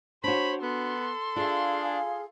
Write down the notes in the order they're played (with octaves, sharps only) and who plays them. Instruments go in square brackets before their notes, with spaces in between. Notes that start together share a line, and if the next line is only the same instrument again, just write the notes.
[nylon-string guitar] D4 F#4 [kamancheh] C5 C#5 [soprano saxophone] B5
[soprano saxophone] B3 [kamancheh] A4 C6
[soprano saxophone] D4 [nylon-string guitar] F4 E5 [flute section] G#4 F5